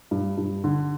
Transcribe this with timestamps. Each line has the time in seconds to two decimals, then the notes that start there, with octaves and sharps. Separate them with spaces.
0.11 G2
0.38 G2
0.64 D3